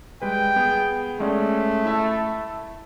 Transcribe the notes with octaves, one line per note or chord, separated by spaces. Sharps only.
G3 G#3 B4 G5
B3 G#4
G#3 A3 C#4 D5
E4 E5 A5